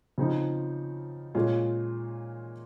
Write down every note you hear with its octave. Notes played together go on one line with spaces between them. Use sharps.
C#3 F3 C4 D#4
A#2 G#3 C#4 F4